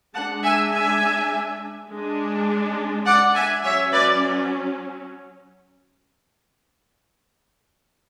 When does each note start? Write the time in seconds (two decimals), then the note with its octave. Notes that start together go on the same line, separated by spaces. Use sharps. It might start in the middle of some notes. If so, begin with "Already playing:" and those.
0.14 G#3 D4 F#5 A5
0.44 E5 G#5
0.73 E5 G#5
1.89 G#3 D4
3.06 D5 F#5
3.35 E5 G#5
3.64 F#3 C#4 C#5 E5
3.93 B4 D5